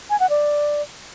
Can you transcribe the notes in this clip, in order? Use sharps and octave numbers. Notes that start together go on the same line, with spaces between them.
G#5
F#5
D5